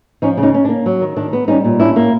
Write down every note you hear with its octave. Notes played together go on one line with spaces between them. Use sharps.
F3 C#4 D#4
C#3
C#4 D#4
C#4
D4
A#3
F#3
D#3
D#3 D4
B3
G3 C#4 D#4
A#2
C#4 D4 E4
A#3